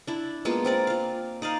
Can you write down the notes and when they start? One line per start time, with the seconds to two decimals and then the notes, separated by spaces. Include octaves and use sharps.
0.07 D4 E4
0.45 G#3 A#3 B3 F4
0.65 C4 A#4 D5
0.87 F4 F5
1.42 D#4 D5 D#5 F5